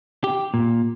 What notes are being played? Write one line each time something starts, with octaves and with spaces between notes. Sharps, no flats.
G4
A#2